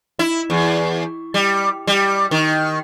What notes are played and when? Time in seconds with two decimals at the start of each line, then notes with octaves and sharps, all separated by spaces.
0.19 E4
0.50 E2
1.34 G3
1.87 G3
2.31 D#3